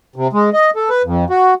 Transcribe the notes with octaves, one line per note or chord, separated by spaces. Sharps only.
C3
G#3
D#5
A4
B4
F2
F#4